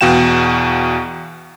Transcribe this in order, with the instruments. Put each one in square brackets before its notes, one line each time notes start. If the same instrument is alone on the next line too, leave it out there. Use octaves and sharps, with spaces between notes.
[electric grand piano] E2 B2 F#4 F5 G5 E7